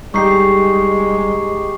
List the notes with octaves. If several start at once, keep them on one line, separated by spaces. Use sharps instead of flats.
G3 G#3 D#4 G4 C#6 C7